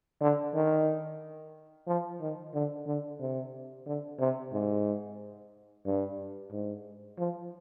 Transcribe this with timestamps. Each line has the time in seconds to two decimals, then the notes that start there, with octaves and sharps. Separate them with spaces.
0.21 D3
0.54 D#3
1.87 F3
2.21 D#3
2.54 D3
2.86 D3
3.20 C3
3.86 D3
4.20 C3
4.53 G#2
5.86 G2
6.52 G#2
7.18 F3